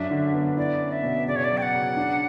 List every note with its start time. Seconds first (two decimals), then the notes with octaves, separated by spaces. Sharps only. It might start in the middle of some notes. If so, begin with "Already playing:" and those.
Already playing: F#2 D4 E5
0.11 D3
0.34 B3
0.57 E4 D5
0.80 C#4
0.92 E5
1.03 B2
1.27 C#3 D5
1.36 C#5
1.44 D5
1.50 F#3
1.57 G5
1.62 F#5
1.75 C#3
1.97 D4